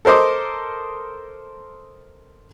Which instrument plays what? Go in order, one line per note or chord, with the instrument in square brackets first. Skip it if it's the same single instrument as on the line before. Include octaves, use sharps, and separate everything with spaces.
[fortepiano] A4 A#4 C5 D#5 D6